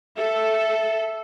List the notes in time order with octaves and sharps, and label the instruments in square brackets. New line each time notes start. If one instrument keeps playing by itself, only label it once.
[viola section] A4 [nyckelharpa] E5